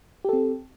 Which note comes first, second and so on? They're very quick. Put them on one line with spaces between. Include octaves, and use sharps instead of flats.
G4 A4 C4